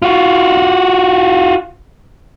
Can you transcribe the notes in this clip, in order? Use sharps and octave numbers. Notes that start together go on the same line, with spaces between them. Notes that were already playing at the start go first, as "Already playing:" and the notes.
F4 F#4